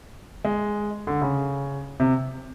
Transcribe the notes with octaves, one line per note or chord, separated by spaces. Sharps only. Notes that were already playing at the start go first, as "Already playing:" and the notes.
G#3
D3
C#3
C3